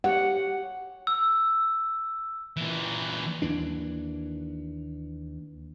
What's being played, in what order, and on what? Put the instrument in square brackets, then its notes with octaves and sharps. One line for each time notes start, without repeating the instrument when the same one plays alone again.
[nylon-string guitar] G4 C#5 [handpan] F#5
[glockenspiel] E6
[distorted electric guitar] A#2 E3
[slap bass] D#2 E3 D4